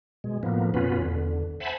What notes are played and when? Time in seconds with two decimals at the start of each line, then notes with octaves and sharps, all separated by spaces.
0.24 B2 G#3
0.43 A2 F3 A#3 B3
0.74 F#2 B2 B3 C#4 F4 B4
1.01 E2 D3
1.60 C5 E5 F#5 G#5 A5 B5